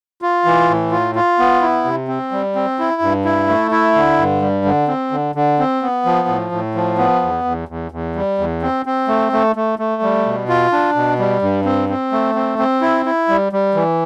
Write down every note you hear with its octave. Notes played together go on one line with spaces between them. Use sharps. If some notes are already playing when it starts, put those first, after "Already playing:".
F4
E3
A2
F4
F4
B3
E4
C3
C4
G3
C4
E4
G2
E4
A3
E4
D3
G2
G3
D3
C4
D3
D3
C4
B3
F3
A2
A2
F3
B3
E2
E2
E2
E2
G3
E2
C4
C4
A3
A3
A3
A3
G3
B2
F4
D4
B2
G3
G2
C4
C4
A3
C4
C4
E4
E4
G3
G3
E3